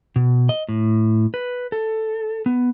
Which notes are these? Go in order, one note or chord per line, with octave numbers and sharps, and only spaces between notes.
B2
D#5
A2
B4
A4
B3